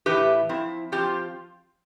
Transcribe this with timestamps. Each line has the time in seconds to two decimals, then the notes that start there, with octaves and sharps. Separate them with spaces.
0.06 A2 E3 A3 E4 G4 B4
0.49 F3 C4 E4
0.92 F3 C4 F4 G4